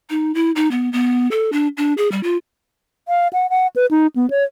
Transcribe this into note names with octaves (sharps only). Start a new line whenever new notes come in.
D#4
E4
D#4
B3
B3
A4
D4
D4
G#4
G3
F4
F5
F#5
F#5
B4
D#4
B3
C#5